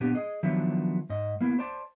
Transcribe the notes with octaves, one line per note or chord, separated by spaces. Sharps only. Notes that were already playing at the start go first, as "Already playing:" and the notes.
A#2 B3 D4 G4
G#4 D#5
D#3 F3 F#3 B3 D4 E5
G#2 D#5
A#3 B3 E4
C5 D5 A5